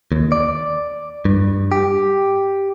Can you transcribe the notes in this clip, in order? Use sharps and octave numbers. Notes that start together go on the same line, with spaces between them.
D#2
D5
G2
G4